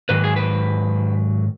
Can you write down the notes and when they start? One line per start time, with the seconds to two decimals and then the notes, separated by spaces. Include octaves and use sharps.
0.09 G#2 D#3 F#3 B4
0.24 G#4
0.36 B4